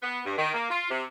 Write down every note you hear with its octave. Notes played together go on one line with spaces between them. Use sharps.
B3
G2
D#3
A#3
F4
C3